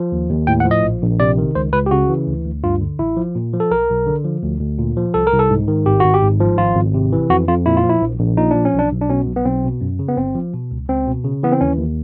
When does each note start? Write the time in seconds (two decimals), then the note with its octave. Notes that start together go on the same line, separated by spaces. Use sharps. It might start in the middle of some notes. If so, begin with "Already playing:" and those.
Already playing: F3
0.12 D#2
0.30 D#2
0.47 A2 G5
0.60 F#5
0.65 F3
0.71 D#5
0.83 A#1
1.01 A#1
1.20 C3 D5
1.38 D#3
1.55 C#2 C5
1.73 C#2 B4
1.86 G4
1.91 C#3 F#4
2.09 E3
2.27 D2
2.45 D2
2.64 G2 F4
2.81 D3
2.99 A1 E4
3.17 F3
3.35 A#2
3.53 F3
3.60 A4
3.71 B1 A#4
3.89 B1
4.06 D3
4.24 F3
4.43 D2
4.61 D2
4.79 A#2
4.97 F3
5.14 C2 A4
5.27 A#4
5.33 C2
5.39 A4
5.50 G#2
5.68 D#3
5.86 G#1 G4
6.00 G#1 F#4
6.14 G4
6.23 G#2
6.40 F3
6.58 G#1 F4
6.76 G#1
6.94 C3
7.12 E3
7.29 F2 F#4
7.47 F2 F4
7.66 A#2 E4
7.77 F4
7.83 F3
7.89 E4
8.02 A#1
8.20 A#1
8.37 A#2 D#4
8.51 F3 D4
8.65 C#4
8.74 B1 D4
8.92 B1
9.01 D4
9.09 B2 C#4
9.28 B1
9.36 B3
9.45 B1 C4
9.64 B2
9.81 F#2
9.99 C#3
10.09 B3
10.17 G1 C4
10.35 F3
10.53 B2
10.71 C#2
10.89 C#2 C4
11.07 B2
11.25 C#3
11.43 E3 B3
11.52 C4
11.61 D#2 C#4
11.78 D#2